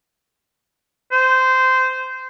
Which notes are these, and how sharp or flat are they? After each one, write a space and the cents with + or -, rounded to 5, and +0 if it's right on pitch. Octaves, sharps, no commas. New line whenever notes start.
C5 -15